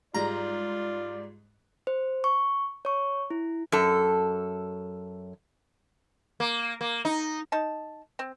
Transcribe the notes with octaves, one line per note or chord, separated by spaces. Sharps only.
G#2 G3 G#3 F4 D5 A#5
C5
C#6
C#5 C#6
E4
F#2 A4
A#3
A#3
D#4
D#4 A5
C4